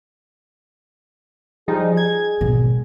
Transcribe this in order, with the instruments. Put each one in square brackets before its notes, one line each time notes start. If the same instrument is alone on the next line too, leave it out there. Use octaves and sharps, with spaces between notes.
[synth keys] F3 G3 D#4 [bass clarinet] G#4
[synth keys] G#6
[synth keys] G#1 [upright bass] B2